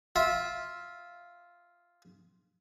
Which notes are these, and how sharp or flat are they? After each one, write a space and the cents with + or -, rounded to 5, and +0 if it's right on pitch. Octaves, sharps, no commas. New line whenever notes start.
F4 +0 E5 -15